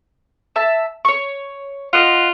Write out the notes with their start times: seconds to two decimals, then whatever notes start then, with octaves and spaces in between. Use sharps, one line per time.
0.56 E5 A5
1.05 C#5 C#6
1.93 F4 D#5 F#5